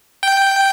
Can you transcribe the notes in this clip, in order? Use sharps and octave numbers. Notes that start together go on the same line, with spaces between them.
G5